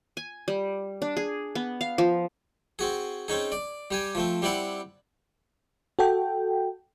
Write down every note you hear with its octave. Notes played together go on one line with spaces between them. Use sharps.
G#5
G3
D4
G#4
B3
F5
F3
C4 F#4 G#4
C4 C#4 D#4 G#4
D5
G3 G4 G#5
F3 A3 C4
G3 C4 E4 D5 F#5
F#4 A4 G5